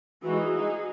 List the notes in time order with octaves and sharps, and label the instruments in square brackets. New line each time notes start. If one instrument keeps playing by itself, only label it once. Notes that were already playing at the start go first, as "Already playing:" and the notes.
[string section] E3 G#3 D#4 [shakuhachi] F#4
[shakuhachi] G#4
[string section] G#3 D#4 F#4